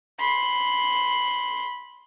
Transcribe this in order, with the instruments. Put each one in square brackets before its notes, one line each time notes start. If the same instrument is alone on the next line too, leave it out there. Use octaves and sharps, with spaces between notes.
[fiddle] B5 C6